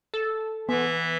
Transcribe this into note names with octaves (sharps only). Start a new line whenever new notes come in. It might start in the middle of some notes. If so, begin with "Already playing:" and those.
A4
E3 B3 E5